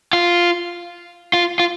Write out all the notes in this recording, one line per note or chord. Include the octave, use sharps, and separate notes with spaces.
F4
F4
F4